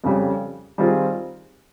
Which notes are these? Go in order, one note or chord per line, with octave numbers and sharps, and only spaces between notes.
F2 C#3 G3
D#3 G3 C4 F4 G#4